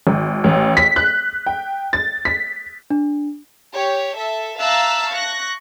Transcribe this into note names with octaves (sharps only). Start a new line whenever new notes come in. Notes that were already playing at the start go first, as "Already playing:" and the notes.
G#1
A1
B6
F#6
G5
A6
B6
D4
G4 C#5
A4 E5
E5 F5 A5 A#5 E6 F#6
C#6 F#6 A#6